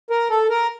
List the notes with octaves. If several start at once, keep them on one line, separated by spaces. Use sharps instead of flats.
A#4
A4
A#4